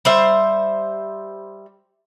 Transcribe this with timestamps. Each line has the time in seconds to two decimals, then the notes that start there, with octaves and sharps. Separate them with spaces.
0.05 G3 C5 E5